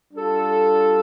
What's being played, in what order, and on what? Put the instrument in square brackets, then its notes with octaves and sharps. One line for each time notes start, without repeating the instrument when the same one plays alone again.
[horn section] G3 D4 F4 A4